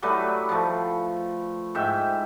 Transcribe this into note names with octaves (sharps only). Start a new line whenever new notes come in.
F#3 G3 A3 B4
F3 A3
G#2 E5 G5